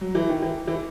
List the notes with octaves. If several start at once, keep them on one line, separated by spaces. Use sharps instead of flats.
F#3
E3
D#3
E3
E3